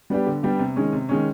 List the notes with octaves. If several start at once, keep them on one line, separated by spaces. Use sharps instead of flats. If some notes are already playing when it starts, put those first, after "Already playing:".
G3 B3 D4 G4
D3
G3 B3 D4 G4
C3
D#3 G#3 C#4
C3
D#3 G#3 C#4